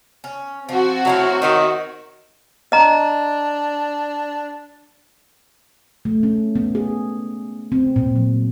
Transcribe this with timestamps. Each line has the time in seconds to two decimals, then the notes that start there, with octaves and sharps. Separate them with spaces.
0.24 C#4
0.69 F3 C4 F#4
1.05 F#3 A3 E4 F5
1.42 D#3 D#4 C#5 E5
2.72 D4 D#5 A#5
6.05 A3
6.23 C#4
6.56 B3
6.75 G#4
7.72 C4
7.96 A#2
8.16 F#3